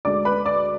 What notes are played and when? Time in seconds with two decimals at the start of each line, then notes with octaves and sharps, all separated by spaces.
0.05 D2 D3 G#3 D4 D5 D6
0.25 B4 B5
0.46 D5 D6